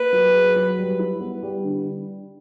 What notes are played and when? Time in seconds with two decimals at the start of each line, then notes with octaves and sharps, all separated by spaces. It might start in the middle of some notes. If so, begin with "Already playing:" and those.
Already playing: A#3 B4
0.13 F#3
0.33 G#4
0.56 F#3
0.78 G3
0.99 E4
1.20 B3
1.43 G3
1.64 D3